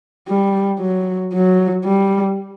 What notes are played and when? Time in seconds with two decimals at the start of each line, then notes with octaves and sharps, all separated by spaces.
0.28 G3
0.80 F#3
1.33 F#3
1.85 G3